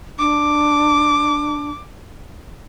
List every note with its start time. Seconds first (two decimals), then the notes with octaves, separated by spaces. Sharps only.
0.19 D4 D6